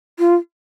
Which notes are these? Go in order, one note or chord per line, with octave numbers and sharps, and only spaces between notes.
F4